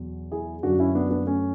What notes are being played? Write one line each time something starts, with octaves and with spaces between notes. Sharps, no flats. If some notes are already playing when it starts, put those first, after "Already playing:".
Already playing: E2 B2 F#3
E4 G#4
F#2 D3 F#3 D4 F#4
C#4 E4
B3 D4
B3 D4
A3 C#4